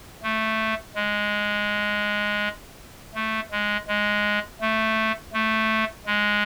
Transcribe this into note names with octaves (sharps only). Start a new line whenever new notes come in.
A3
G#3
A3
G#3
G#3
A3
A3
G#3